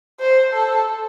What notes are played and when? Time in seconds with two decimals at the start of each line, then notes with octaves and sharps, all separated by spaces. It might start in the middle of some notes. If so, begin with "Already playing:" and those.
0.20 C5
0.54 A4